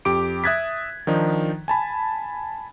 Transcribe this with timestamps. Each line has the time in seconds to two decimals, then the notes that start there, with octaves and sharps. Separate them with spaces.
0.05 F2 G4 D6 D7
0.44 E5 D#6 F#6 G#6 A6 B6
1.07 D#3 F3 D4 D#4
1.68 G#5 A5 B5